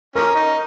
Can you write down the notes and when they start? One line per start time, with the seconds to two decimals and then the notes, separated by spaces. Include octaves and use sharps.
0.15 F3 A#3 C#4 A#4 A#5
0.36 D#4